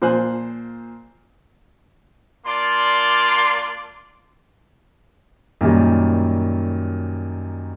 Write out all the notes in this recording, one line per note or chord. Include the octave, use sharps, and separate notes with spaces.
A#2 F3 C5 G#5 F#6
A#3 D4 F4 D5 C6
F#2 A#2 D#3 G3